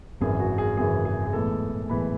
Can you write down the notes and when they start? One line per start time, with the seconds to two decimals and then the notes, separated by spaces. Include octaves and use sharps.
0.21 G#1 F#2 C#3 E3 G#4
0.40 F#4
0.58 G#4
0.77 G#1 F#2 C#3 E3 G#4
1.05 G#4
1.26 G#4
1.33 B1 A2 E3 G#3 A4
1.89 B1 A2 E3 G#3 B5